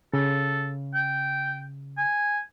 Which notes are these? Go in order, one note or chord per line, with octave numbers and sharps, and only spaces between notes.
C#3 A4
G5
G#5